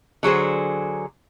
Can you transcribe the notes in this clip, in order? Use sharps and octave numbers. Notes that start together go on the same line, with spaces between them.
D3 F#3 G#4 C5